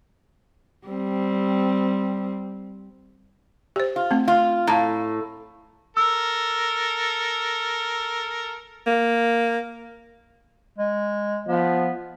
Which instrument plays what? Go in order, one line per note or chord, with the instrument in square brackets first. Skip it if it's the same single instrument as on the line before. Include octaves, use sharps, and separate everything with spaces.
[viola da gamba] G3 C4
[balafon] G4 C5
[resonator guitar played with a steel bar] F4
[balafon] A3 C4
[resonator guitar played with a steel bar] F4
[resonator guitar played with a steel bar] A2 [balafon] F5 A5 A#5
[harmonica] A4 A#4 [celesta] E6
[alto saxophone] A#3
[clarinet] G#3
[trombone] F3 [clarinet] B3